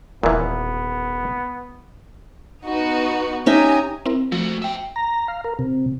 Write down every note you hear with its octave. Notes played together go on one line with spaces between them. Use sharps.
D#1 A#2 E3 B3
B3 D#4 F#4
C#4 D#4 G4 E5 G#5 A#5
C4 E4 A#4
F3 A3 F#4
E5 G5
A#5
F5
A#4
C3